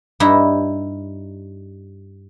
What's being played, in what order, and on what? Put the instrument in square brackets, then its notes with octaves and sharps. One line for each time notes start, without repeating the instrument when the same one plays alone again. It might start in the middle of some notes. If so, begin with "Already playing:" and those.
[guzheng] G2 D#4 E4 E5